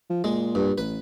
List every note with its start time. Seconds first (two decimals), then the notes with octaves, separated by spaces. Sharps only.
0.10 F3
0.24 A#2 G#3
0.55 G2
0.78 A1 B4